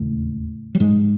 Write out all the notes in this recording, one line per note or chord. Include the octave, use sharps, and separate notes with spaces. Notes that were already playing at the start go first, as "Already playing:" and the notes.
Already playing: E1 D#2 A2 C#3 A3
F#3
G#2 G#3